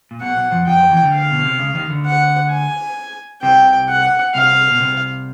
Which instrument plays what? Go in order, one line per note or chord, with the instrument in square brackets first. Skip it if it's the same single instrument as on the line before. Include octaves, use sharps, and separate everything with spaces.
[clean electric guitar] A#2
[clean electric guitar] B1 B2 [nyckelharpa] F#5
[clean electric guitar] B1 B2
F2 F3
[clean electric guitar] F2 F3 [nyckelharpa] G5
[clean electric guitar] F2 F3
E2 E3
D2 D3
[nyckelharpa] F5
[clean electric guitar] B2
C3
C#2 C#3
D#2 D#3
D2 D3
[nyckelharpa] F#5
G#5
[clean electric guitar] C2 C3 [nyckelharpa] G5
[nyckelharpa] F#5
[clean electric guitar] C2 C3 [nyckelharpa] F5
[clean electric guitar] B2
C2 C3